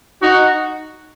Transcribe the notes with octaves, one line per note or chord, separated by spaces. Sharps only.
D#4 F#4